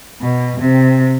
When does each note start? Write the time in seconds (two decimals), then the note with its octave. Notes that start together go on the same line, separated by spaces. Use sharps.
0.22 B2
0.60 C3